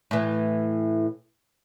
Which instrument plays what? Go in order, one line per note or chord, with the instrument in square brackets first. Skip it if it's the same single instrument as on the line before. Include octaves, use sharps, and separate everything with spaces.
[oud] A2 E3